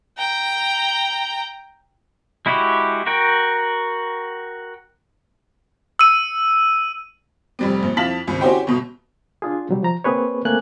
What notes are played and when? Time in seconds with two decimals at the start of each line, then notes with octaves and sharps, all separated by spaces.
0.18 G5 A#5
2.46 G#3 E4 F#4 G4
3.06 F#4 A#4 G5
5.99 E6 D#7
7.59 F1 G3 C4
7.82 A#1
7.97 F2 E4 F5 A5 B6 F#7
8.27 G#1 C#2
8.41 C#4 E4 F#4 G4 C5 G5
8.67 G1 B2
9.42 D4 F4 G#4
9.69 C3 F#3 G3
9.83 F3 A#5
10.04 A#3 C4 G#4 B4 C#5
10.45 A3 A#3 C4 G#5 F#6